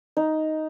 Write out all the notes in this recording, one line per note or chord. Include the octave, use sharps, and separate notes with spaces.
D#4